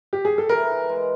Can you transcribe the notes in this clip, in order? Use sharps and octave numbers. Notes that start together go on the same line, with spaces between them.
G4
G#4
A4
E3 A#4
E3
G#3